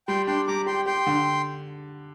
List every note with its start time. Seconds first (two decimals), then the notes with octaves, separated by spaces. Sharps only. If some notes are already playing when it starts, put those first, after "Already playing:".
0.08 G3 G5 C6
0.27 D4 G5 C6
0.48 G3 A#5 D6
0.66 G4 G5 C6
0.86 G4 G5 C6
1.07 D3